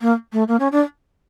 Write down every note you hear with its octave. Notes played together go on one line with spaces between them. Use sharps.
A#3
A3
A#3
C#4
D4